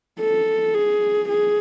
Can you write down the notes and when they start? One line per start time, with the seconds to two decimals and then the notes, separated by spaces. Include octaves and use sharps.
0.20 A4
0.75 G#4
1.29 G#4